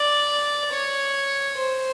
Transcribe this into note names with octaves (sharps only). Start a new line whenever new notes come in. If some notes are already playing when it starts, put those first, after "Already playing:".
Already playing: D5
C#5
C5